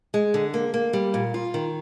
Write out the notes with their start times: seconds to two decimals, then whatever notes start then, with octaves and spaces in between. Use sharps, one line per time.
0.14 G#3
0.34 D3
0.54 A#3
0.74 A#3
0.93 G3
1.14 A#2
1.34 F4
1.54 D#3